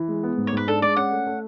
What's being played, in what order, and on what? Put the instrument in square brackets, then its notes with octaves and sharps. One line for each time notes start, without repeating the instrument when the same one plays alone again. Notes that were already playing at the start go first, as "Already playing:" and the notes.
Already playing: [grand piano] E3
G#3
B3
G#2
[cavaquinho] C#5
[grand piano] G#2 [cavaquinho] B4
[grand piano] D4 [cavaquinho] A4
[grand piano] G#3 [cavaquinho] D5
[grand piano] C#4 [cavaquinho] F#5
[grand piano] A3
A3